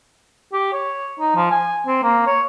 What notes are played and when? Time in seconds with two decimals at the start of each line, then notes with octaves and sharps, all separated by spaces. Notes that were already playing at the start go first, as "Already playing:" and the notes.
0.53 G4
0.73 C#5
1.20 D#4
1.36 F3
1.51 G#5
1.87 C4
2.03 A#3
2.27 C#5